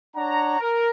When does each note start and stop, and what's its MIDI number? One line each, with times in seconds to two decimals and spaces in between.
0.16 0.57 62
0.16 0.57 73
0.16 0.57 78
0.16 0.57 82
0.60 0.90 70